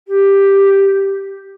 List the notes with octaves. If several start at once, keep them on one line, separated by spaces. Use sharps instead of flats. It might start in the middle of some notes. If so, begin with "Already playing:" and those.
G4